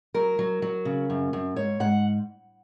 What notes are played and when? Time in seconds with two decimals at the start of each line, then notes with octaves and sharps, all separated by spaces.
0.14 F#3 A#4
0.39 F#3
0.62 F#3
0.85 C#3
1.10 F#2
1.33 F#2
1.56 G#2 C#5
1.80 G#2 F#5